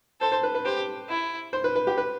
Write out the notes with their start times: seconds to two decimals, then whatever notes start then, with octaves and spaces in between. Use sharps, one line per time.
0.21 A4 C5
0.32 C5
0.43 B4
0.55 B4
0.65 G4 C5
1.09 E4
1.53 C5
1.64 B4
1.75 B4
1.87 G4
1.98 B4